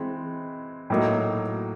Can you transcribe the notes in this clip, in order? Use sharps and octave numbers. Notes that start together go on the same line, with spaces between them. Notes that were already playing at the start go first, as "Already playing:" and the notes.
Already playing: E3 G#3 C4
A2 F#3 A#3 D#4